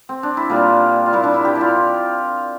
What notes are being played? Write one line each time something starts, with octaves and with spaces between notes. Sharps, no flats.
C4
D4
E4
A#2 G3 A#3 F4
F4
A#2 G3 A#3 E4
D4
E4
G4
E4
F4